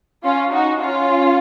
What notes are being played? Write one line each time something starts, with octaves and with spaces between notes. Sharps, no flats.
C#4 F4
D#4 F#4
C#4 F4